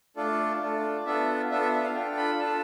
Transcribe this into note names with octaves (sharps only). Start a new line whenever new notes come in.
A3 D4 F4 A4 D5
A3 D4 F4 A4
B3 D4 F4 A4 E5
B3 D4 F4 A4 E5
E5
E5
F5
D4 F4 A4 G5
B5
D4 F4 A4 A5